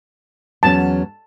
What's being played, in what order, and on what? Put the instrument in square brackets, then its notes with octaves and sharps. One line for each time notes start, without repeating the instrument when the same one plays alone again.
[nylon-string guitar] E2 F#3 C#4 [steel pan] A5